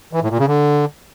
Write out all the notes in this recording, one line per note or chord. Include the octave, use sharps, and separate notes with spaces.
E3
A2
A#2
C#3
D3